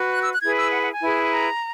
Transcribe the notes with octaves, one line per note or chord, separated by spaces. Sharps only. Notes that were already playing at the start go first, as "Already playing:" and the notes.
Already playing: F#4 B4
F#6
E6
F#6
E4 G#4 B4 G#6
E6
F#5
F#5
G#5
E4 G#4 B4
A#5